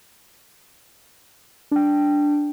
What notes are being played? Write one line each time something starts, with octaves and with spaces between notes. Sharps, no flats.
D4 G5